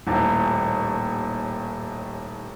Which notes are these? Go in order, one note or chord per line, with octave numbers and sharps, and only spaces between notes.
D#1 D#2 A2